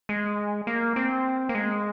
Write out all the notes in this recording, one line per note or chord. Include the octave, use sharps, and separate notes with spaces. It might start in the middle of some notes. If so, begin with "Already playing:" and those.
G#3
A#3
C4
A#3
G#3